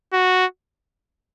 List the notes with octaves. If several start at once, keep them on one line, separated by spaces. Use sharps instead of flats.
F#4